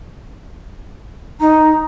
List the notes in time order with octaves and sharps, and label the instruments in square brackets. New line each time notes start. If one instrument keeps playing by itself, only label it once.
[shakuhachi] D#4 [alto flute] A#5